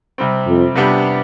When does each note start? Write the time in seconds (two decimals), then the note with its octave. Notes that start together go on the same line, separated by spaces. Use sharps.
0.18 C3 G3 C4
0.47 F2
0.75 C3 G3 B3 D4 G4